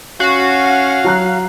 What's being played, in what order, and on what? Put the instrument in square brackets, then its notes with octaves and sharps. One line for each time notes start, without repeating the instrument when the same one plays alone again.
[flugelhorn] C#4 [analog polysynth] F#4 [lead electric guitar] F5
[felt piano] F#3 A#5 F#6